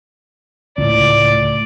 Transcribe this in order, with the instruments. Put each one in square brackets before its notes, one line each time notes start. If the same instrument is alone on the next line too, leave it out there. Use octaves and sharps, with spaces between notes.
[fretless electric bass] C#2 A2 [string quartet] D5